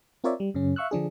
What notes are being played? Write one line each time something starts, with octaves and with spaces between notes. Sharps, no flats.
C4 F4 A#4 C#5 D5 E5
G3
F#2 C#3 C#4
E5 F5 C#6 E6 F#6
D3 F3 D4 G#4